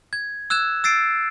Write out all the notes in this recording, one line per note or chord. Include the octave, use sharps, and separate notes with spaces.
G#6
E6 F#6 G#6 E7
E6 A6 C7 D7